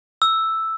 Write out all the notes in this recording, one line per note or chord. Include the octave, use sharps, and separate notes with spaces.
E6